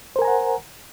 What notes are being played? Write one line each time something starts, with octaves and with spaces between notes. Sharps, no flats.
A#4 C5 F#5 G#5 A#5